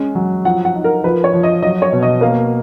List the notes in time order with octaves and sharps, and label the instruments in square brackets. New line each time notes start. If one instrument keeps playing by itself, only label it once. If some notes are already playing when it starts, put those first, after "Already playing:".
Already playing: [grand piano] G#3 C#4
F#3
[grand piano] F3 [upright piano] F#5
[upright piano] F#5
[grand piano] D#4
[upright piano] A#4
[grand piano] F3 [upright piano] B4
[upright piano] C#5
[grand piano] F3
[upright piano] D#5
[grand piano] F#3 [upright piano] D#5
[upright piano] C#5
[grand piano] B2
[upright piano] D#5
[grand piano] A#3 [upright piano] F5